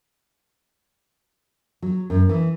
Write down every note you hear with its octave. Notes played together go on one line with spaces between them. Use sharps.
F#3
F#2
E3